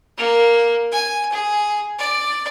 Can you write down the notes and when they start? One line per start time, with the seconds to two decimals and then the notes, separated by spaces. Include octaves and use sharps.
0.18 A#3
0.92 G#5
1.32 G#4
1.99 D5